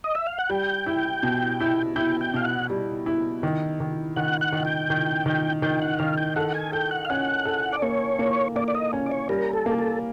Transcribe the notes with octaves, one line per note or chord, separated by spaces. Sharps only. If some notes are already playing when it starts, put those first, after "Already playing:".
D#5
E5
F5
F#5
G3 G5
E4
B2
E4
E4 G5
G5
B2 F5
F#5
G3
E4
D#3
D#3
D#3 F#5
F#5
D#3
G5
D#3
D#3
D#3 G5
F#5
D#3 F5
G5
A4 F#5
G#5
A4 G5
F#5
F5
C#4 F#5
A4
D5
A#3 C#5
A#3
A#3 D5
D5
D#5
C#4
D5
C#5
G3 A#4
A4
A#3
A4